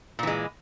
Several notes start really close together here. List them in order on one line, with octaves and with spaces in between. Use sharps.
A#2 E3 G#3